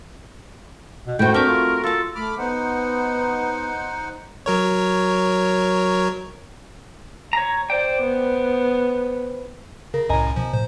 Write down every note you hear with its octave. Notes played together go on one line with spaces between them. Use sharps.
B2
F#2 A2 A3 F#4 C5 G5
C4 D4 A#4 E5 D6
F4
F4 A4 A#4 A5
A3 B5 D6 F6
B3 D#4 C5 F#5
F#3 A#4 C#5
C#5 A#5
C5 D5 G5
B3
C#3 A#4
C2 F#2 A2 D#5 G#5 A#5
B2 F3
A2 C5